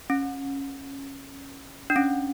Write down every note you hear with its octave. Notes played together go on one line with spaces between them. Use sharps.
C#4
D4
C#4